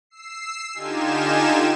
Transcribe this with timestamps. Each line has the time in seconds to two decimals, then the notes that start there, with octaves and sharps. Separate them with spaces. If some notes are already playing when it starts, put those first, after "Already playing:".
0.10 E6 C7
0.74 D3 D#4 F4 G4 G#5 E7